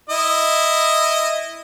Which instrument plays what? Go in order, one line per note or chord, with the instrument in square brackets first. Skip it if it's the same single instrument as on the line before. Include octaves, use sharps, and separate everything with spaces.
[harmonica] E4 D#5